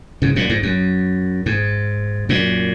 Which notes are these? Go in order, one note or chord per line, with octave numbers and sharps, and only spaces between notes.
G#2 C#3
F#2 A#2
G#2
F#2
G#2
F#2 A#2